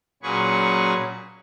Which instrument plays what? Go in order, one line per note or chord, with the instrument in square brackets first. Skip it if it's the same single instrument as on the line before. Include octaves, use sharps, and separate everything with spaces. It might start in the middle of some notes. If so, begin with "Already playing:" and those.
[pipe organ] A#2 F#3 C#4 G#4 B4 C#6